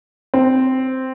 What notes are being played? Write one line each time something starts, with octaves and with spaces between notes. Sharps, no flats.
C4